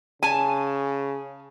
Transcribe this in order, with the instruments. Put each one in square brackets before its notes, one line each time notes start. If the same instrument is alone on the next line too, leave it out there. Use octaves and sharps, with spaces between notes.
[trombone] C#3 [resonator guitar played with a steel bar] G#5 A5